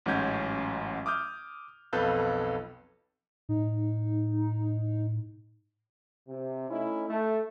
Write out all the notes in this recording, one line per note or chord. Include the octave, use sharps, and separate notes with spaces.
A1 G#2 F#3 C#4 G6 G#6
D6 D#6 F6 G6
B1 F2 A4 B4 F5 G6
A2 D#4
C3
A3 C#4 D#4 E4
A3